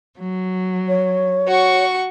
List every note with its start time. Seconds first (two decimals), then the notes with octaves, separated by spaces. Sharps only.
0.18 F#3
0.88 C#5
1.47 F#4 C#6